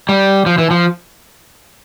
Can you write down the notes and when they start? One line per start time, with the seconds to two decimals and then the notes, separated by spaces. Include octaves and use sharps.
0.09 G3
0.46 F3
0.58 E3
0.71 F3